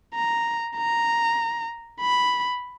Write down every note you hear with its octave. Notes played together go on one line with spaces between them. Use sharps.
A#5
A#5
B5